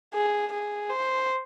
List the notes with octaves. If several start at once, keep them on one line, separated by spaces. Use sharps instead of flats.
G#4
G#4
C5